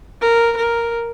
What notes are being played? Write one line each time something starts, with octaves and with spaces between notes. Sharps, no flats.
A#4
A#4